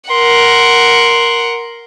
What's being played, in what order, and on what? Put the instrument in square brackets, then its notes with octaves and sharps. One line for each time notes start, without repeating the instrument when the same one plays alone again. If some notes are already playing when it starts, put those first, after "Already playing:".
[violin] A#4 F#5 [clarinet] C6